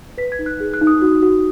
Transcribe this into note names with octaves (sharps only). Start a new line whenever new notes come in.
B4 B6
G#6
D#4
F#6
G#4
F#6
D#4
D#6
F#4
F#4